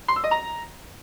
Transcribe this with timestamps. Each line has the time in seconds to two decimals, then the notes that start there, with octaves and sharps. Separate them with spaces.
0.08 C6
0.16 E6
0.24 D#5
0.31 A#5